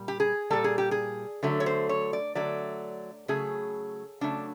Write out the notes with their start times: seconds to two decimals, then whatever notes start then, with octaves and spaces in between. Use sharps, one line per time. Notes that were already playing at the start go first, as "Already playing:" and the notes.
Already playing: A#2 G3
0.08 G4
0.20 G#4
0.50 A#2 G3 A4
0.64 G#4
0.78 G4
0.91 G#4
1.43 D3 F#3 A3
1.60 C#5
1.66 C5
1.89 C#5
2.13 D5
2.35 D3 F#3 A3 D5
3.28 C#3 F#3 A3 G#4
4.21 C#3 F#3 A3 D4